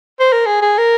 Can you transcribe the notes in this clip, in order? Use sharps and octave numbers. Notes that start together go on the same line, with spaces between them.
C5
A#4
G#4
G#4
A#4